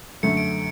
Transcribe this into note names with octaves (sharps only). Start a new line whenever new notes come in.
F#2 D3 A3 C#7
D7